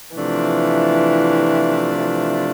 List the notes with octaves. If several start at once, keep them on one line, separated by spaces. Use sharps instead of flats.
C3 E3 F3 A3 D4 F4
E3